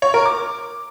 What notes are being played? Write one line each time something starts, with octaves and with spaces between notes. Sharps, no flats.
C#5
A#4
D6